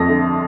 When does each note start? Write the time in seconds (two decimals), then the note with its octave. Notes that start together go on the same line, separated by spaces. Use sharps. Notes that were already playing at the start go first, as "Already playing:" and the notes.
Already playing: F2 F3 A#6
0.09 D3